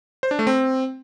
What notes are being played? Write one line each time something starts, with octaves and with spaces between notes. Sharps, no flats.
C5
D4
A3
C4